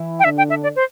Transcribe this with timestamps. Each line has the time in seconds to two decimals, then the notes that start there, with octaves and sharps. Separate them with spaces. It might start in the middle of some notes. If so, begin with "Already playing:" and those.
Already playing: E3 E4
0.19 G5
0.24 D3 D4 E5
0.38 G5
0.50 E5
0.63 D5
0.76 C5